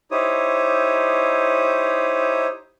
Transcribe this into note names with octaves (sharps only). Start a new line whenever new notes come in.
D#4 E4 G4 C5 C#5 D#6